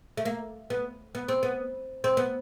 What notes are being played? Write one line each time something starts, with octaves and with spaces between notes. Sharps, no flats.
A3
A#3
B3
B3
C4
B3
C4
B3